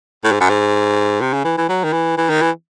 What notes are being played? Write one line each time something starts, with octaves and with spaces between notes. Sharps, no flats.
A2
G#2
F#2
G#2
C3
C#3
E3
E3
F#3
D#3
E3
E3
D#3
E3